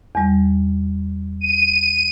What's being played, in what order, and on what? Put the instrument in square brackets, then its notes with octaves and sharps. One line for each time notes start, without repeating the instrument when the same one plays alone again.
[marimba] E2 G3
[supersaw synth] D#7